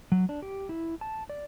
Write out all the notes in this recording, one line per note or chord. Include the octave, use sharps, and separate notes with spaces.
F#3
D4
G4
E4
A5
D5